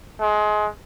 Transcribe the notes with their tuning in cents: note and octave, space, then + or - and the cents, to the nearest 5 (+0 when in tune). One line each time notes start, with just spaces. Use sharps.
G#3 +25